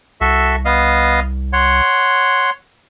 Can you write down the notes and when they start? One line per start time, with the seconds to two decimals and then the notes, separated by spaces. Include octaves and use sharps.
0.21 C2 F#4 A4 E5
0.65 B3 D#5 F5
1.53 C#5 F#5 C6